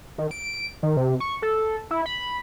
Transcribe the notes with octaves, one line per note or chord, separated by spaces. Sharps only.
D#3
D7
D#3
C3
C#6
A4
E4
B5